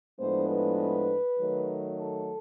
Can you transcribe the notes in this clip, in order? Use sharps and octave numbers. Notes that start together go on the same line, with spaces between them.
A2 F3 G#3 B3 D4 C5
B4
D#3 F#3 A3
A4